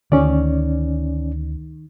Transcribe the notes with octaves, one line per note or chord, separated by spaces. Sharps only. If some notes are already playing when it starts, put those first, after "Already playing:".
D2 D#3 C#4 D5